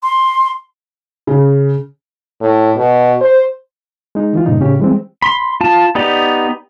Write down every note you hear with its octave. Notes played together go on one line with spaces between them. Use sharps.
C6
C#3
A2
B2
C5
G#3 D#4
D#3 E3 F4
G2 A#2 C#3 D#4
A2 C#3 C#4 G4
E3 G3 G#3 B3 C4
B5 C6
F4 A5
B3 D#4 G4 D5